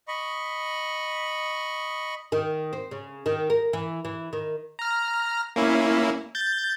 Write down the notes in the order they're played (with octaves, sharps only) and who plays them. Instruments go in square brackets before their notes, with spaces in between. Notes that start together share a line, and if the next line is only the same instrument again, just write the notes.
[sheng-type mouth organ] D#5 B5 C#6
[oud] D#3
C4
C#3
D#3
A#4
E3
E3
D#3
[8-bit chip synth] A#5 F6
A#3 C#4 E4
G6 A6